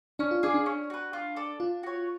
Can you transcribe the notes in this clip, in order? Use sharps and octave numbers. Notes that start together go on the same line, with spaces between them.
C#4 D4
F4
D4 G#4 D5 F5
D4
C#4
F#4 B4
F4
A4 D5
D4 F4
F#4 C#5